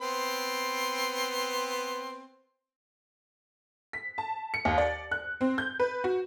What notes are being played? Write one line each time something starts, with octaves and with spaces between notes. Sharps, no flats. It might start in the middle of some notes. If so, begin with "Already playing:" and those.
B3 C4 C6
B6
A5
C#7
D#2
D5
F#6
C4
G6
B4
F#4